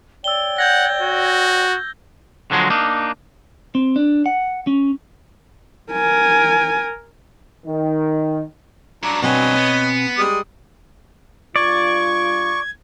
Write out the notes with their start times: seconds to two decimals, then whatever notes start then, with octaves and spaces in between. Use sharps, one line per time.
0.24 C#5 D5 G5 E6 G7
0.58 F#5 G6 G#6 A#6
1.01 F#4
2.51 D3 F3 F#3 G#3
2.70 A#3 D4 D#4
3.75 C4
3.96 D4
4.26 F#5
4.67 C#4
5.93 A#4 G#5
7.66 D#3
9.03 G2 F#3 D4 A#5
9.22 B2 C4 B4 C#5 D#5 G#5
9.56 B3
10.18 G3 G#3 D#6
11.56 G2 F4 D5 C#6 G#6